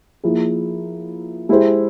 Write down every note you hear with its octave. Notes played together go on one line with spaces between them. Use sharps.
F3 A#3 E4 G#4
G#3 E4 G4 C5